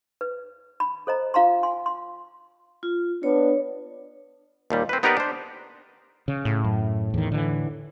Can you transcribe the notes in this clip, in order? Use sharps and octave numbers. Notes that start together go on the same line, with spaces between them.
B4
B5
A4 C5 D#5 A#5
F4 F5 A#5 C6
G#5 C6
C6
F4
B3 D4 C#5
D#2 A#2 G3
C4 B4
B3 D#4 G4 A#4 B4 D5
D4 C5
C#3
A2
F#2
E2 D#3
D3 E3